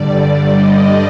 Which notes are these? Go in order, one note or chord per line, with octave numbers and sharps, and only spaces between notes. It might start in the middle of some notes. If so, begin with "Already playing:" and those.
Already playing: G2 D3 G3 D5
D#5